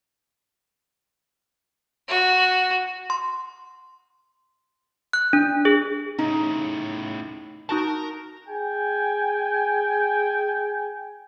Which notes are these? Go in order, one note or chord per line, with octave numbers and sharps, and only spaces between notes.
F#4
C6
F#6
D4
G#4
A2 C#3 D#4
D#4 F#4 A#4 A5 A#5
G#4 G5 G#5